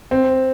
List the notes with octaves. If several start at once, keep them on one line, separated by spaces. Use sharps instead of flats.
C4